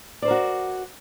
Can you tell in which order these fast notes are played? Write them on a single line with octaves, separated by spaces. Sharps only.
D5 C5 A#4 F#4